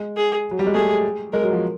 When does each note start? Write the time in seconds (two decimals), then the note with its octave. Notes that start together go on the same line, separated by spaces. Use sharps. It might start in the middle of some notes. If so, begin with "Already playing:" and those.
Already playing: G#3
0.16 G#4
0.51 F#3
0.59 G3
0.67 G#3
0.74 A3 G#4
1.32 G#3 A#4
1.43 F#3
1.52 F3